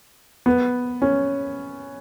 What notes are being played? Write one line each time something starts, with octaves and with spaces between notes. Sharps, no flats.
B3
C#4